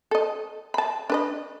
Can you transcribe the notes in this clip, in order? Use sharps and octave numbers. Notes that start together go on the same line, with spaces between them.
A4 D#5
A5 B5
D4 B4 D#5